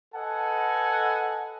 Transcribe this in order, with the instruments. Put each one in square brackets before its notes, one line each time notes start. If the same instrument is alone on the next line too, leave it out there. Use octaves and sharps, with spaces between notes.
[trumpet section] A4 B4 D#5 F#5 G#5